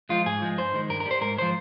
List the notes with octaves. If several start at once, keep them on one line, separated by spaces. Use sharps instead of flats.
F3 G#3 F4
G#2 G#4
F3 G#3
G2 C5
D#3 G#3
G2 A#4
A#4
G3
C5
G#2 A#4
F3 G#3 C5